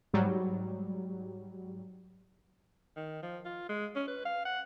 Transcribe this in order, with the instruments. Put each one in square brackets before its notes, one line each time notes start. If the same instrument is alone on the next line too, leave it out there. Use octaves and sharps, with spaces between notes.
[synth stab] G#2 F#3 G3
[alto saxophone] D#3
F3
F4
G#3
C#4
B4
F5
F#5